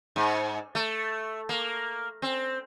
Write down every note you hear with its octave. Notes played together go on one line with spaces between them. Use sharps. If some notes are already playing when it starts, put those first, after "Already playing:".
G#2
A3
A#3
C4